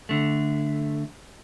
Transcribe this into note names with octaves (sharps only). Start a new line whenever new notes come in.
D3 A3